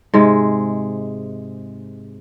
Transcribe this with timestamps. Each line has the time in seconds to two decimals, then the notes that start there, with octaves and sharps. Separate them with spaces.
0.13 G#2 C3 G#3